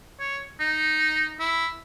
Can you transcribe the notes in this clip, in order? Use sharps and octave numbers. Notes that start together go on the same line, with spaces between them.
C#5
D#4
E4